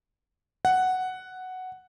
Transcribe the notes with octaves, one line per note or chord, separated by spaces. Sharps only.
F#5